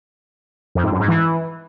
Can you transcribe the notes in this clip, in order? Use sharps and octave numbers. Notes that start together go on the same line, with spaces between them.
F2
G#2
F#2
G#2
E3